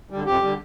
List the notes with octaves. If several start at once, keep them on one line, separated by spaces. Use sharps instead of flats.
D3 G3
F2 G4
D3 G3